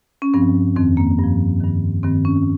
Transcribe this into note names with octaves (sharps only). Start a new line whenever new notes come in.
C#4
G2 F3 C4
F2 D#3 C4
A#3
G2
F3
G2 D#3
G2 D#3 C4
C#4